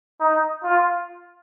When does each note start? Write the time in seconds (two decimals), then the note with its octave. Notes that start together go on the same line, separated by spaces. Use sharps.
0.20 D#4
0.63 F4